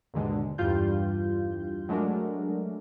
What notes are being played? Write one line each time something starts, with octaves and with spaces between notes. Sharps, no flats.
D#2 G#2 B2 D3 G#3
E2 G2 G3 F4 G6
F#3 G#3 A3 D4 A#4